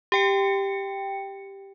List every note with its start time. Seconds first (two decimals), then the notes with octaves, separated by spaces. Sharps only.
0.12 G4 G5 C#7